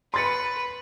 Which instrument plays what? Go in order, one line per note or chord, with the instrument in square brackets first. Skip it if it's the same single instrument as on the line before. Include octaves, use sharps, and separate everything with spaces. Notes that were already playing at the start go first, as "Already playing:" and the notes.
[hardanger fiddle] B4 [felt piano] C6 A6 C#7